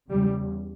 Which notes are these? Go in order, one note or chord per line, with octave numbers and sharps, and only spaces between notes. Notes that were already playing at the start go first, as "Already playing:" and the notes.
E2 C#3 G3